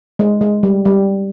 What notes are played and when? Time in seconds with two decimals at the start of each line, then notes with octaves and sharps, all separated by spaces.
0.19 G#3
0.41 G#3
0.63 G3
0.85 G3